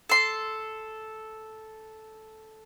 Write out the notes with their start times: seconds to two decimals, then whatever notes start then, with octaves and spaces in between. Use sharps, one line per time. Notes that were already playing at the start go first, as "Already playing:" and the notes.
0.09 A4 C6